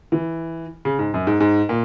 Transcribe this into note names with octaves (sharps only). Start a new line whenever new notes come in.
E3
C#3
G#2
F#2
G#2
G#2
A#2